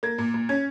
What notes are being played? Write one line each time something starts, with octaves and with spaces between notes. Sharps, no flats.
A#3 G#6
A#2
A#2
C#4 G#6